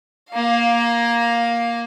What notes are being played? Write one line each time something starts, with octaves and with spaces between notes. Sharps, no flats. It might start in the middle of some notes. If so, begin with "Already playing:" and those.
A#3 F5